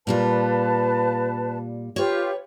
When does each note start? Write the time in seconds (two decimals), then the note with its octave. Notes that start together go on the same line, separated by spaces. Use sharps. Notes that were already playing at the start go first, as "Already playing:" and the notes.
0.07 A#2 G3 F4 B4 A5
1.96 F4 G4 B4 C#5